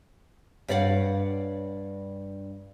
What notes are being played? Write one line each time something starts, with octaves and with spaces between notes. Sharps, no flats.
G2 C#5 D5 F5 F#5